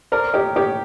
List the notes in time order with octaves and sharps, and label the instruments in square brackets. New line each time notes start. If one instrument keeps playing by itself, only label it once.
[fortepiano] A#4 [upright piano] C5 D5
[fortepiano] G4 [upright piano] C#5 D#5
[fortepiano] G4 [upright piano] C#5